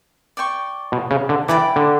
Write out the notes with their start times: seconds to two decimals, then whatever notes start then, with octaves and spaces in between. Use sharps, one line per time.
0.37 D5 G5 C#6
0.92 B2
1.11 C#3
1.29 D3
1.48 E3 D5 G5 B5 D6
1.76 D3